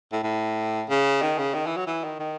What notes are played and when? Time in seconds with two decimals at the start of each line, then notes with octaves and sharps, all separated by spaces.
0.12 A2
0.24 A2
0.89 C#3
1.22 D#3
1.39 C#3
1.54 D#3
1.66 E3
1.77 F#3
1.87 E3
2.04 D#3
2.20 D#3